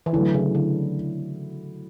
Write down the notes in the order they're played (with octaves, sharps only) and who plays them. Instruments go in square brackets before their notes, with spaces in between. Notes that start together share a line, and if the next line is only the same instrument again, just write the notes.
[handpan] E3
[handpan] D3 [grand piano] F#3 A3 E4
[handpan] C#3
D3